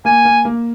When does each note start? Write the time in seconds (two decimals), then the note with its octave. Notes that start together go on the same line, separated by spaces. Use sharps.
0.05 A#3 G#5
0.25 A#3
0.45 A#3